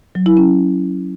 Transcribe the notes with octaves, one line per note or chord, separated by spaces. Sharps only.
F#3
E4
C#4